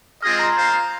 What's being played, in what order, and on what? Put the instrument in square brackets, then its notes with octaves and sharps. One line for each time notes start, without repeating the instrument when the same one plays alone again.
[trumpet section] G#3 C4 F4 G#4 D#5 [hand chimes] F6
[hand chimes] D#6
A#5
C6
[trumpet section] F4 C5 F5